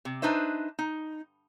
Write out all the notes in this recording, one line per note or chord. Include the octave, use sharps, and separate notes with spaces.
C3
D4 D#4 B4 C5 E5
D#4